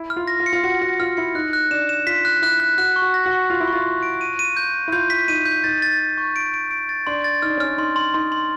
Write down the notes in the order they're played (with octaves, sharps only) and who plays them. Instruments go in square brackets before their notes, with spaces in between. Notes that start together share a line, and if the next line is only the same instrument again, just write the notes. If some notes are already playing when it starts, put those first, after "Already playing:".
Already playing: [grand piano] E4
[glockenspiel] F6
[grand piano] F4
[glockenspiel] A#6
[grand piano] F4
[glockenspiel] C#7
[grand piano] F4
[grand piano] F#4 [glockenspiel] C#7
[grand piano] F#4 [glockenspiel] A#6
[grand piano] F4 [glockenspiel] F6
[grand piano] E4 [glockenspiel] C#7
[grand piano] D#4 [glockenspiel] F#6
[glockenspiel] F#6
[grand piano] D4 [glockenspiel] E7
[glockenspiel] E7
[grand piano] F4 [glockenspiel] B6
[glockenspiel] F#6
[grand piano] E4 [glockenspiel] F#6
[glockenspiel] F#6
[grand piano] F#4 [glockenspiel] F#6
[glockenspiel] C#6
[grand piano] F#4
[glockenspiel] A#6
[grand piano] F#4
[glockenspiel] C#6
[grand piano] F4 [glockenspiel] C#6
[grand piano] E4
[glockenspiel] C#6
[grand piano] F4
[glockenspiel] C#6
D7
D#7
D#7
G6
G6
[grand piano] E4
[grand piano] F4 [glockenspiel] G6
[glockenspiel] B6
[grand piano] D#4 [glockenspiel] D#7
[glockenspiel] G6
[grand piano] D#4 [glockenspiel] A6
[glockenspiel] A6
A6
C#6
D7
D7
D7
A6
[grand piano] D4 [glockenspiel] C6
[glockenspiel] A6
[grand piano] D#4 [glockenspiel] F6
[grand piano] D4
C#4
[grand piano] D4 [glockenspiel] F6
[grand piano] D#4 [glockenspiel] C6
[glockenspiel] C6
[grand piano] D#4 [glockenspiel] C6
[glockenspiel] C6